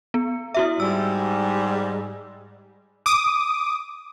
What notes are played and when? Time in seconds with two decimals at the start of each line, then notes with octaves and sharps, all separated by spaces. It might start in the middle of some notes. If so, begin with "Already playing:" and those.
0.14 B3
0.55 E4 F#4 E5
0.80 G#2 G3 E6
3.06 D6 D#6